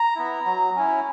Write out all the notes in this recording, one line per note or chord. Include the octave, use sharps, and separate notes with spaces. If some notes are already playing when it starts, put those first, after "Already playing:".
Already playing: A#5
B3 E4
F#3
C#4 E4